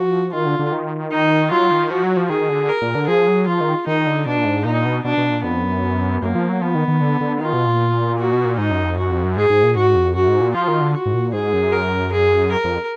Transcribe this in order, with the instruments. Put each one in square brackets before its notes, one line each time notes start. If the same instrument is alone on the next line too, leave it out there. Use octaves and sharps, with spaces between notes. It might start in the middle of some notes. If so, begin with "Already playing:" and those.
Already playing: [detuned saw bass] F3 [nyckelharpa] F#4
[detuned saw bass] D#3 [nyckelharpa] F4
[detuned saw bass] D3
D3
D#3
[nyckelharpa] D#4
[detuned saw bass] F#3 [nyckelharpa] F4
[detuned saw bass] D#3
[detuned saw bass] F3 [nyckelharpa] F#4
[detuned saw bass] F#3
F3
[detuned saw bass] D#3 [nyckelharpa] G#4
[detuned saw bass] D3
[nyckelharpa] A#4
[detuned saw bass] A#2
D3
[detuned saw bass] F3 [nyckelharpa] G#4
[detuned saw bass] F#3
[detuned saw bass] F3 [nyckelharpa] F4
[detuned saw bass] D#3
[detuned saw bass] D#3 [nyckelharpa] D#4
[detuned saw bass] D3
[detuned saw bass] B2 [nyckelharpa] D4
[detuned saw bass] A#2
G#2
[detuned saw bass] A#2 [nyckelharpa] D#4
[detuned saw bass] B2
[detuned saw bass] B2 [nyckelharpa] D4
[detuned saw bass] B2
A#2
[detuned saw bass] F2 [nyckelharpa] B3
[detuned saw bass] F#2
[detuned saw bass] F#2 [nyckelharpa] A#3
[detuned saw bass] F3
F#3
[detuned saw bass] F3 [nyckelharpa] B3
[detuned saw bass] D#3
D#3
D3
D3
[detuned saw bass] D#3 [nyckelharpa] F4
[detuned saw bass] B2
A#2
[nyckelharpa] F#4
[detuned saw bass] B2
A#2
[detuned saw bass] G#2 [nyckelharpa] D#4
[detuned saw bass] F#2
F2
[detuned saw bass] F#2 [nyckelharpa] F#4
[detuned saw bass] F2
F#2
[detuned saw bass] G#2 [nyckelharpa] G#4
[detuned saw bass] G#2
A#2
[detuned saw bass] G#2 [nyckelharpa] F#4
[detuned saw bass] F2
[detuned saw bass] F#2 [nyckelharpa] F#4
[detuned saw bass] G#2
A#2
[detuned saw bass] F3 [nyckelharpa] F4
[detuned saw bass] D#3
D3
[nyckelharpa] F#4
[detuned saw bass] G#2
A#2
[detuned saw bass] G#2 [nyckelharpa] G#4
[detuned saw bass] F#2
[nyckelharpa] A#4
G#4
A#4
[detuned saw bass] F2